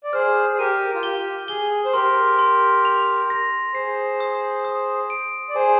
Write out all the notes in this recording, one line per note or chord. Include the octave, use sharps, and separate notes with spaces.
D5
G#4 C5 F6
G#4
G4 A#4 D#7
F4
G4 G7
G#4 G7
C5
G4 A#4 C6
C6
F7
A#6
G#4 C5 C7
D#6
D#6
D7
D5
G#4 C5 G#5